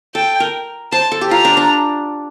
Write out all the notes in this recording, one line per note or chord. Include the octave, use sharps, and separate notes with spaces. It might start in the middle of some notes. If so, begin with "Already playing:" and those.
A4 G5
A#4
C5 A5
A4
G4
F4 A#5
D4
D4